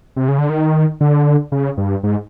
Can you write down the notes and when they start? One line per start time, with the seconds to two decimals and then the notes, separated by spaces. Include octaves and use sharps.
0.16 C3
0.28 C#3
0.38 D3
0.49 D#3
1.01 D3
1.52 C#3
1.78 G2
2.03 G#2